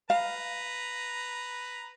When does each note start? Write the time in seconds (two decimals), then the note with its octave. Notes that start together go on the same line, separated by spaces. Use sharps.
0.10 B4 F5 A#5